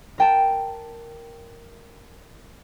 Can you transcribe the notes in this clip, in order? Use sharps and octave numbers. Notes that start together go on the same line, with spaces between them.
A#4 G5 A5